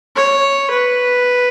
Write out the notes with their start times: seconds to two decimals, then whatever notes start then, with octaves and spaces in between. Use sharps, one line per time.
0.16 C#5
0.70 B4